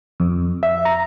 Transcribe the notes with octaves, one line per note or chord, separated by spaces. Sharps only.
F2
E5
A#5